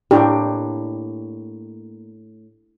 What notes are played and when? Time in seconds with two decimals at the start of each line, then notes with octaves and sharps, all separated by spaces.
0.11 A2 A#3 D4 G4